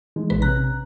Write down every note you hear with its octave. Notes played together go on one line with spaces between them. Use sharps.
E3 G#3 D#4
A#1 B4
C3 C#4 A#5 F#6